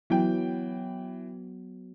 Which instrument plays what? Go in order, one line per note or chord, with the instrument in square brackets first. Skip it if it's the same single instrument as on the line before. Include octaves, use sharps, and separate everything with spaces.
[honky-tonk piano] E3 G5 [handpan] F#3 B3